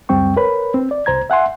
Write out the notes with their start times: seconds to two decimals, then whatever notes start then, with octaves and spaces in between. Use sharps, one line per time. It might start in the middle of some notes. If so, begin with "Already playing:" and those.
0.09 C#2 F#2 G3 C4 G5 C#6
0.36 A#4 B4 C#5 B5
0.74 C4
0.91 D5
1.06 C2 C5 A#5 G#6
1.30 E5 F#5 G#5 C6